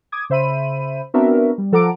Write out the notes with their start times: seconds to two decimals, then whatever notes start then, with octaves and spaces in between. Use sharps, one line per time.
0.12 D6 D#6 G#6
0.30 C#3 C5 E5 B5 D#7
1.14 B3 C4 D4 F#4 A#4 E5
1.58 G3
1.72 F3 A4 F#5 A#5 D6 D7